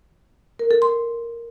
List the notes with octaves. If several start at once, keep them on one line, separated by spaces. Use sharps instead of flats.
A#4
A4
C6